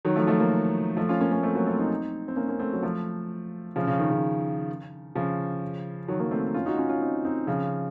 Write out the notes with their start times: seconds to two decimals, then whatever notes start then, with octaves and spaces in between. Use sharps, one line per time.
0.05 D#3 F#3
0.16 F3 A3
0.27 F3 A3
0.39 F#3 A#3
0.97 F3 A3
1.09 C#4 F4
1.21 A#3 C#4
1.32 A#3 C#4
1.43 A3 C4
1.55 F#3 A#3
1.66 A3 C4
1.78 C4 D#4
2.28 C4
2.36 A#3 C#4
2.48 A#3 C#4
2.59 A3 C4
2.73 F#3
2.83 F3 A3
3.76 C#3 F3
3.87 C#3
3.99 D#3
4.11 C#3
5.15 C#3 F3
6.08 D#3 F#3
6.19 F#3 A#3
6.31 A3 C4
6.54 C#4 F4
6.66 D#4 F#4
6.77 C#4 F4
6.89 C#4 F4
7.01 C4 D#4
7.24 C4 D#4
7.47 C#3 F3